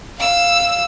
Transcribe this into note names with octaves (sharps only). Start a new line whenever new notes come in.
F5 E6